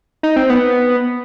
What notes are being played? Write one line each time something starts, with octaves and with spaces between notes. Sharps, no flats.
D#4
C4
B3